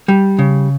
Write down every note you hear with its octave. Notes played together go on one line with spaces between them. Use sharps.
G3
C#3